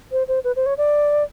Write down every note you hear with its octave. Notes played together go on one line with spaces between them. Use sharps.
C5
C5
B4
C5
C#5
D5